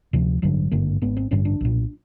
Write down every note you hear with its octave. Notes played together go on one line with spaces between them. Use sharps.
D2 C3 F3
A1 G2 D3 F#3
G#1 G2 D3 A#3
G#1 G#2 B3
C4
A1 G2 D3 C#4
D4
B1 A#2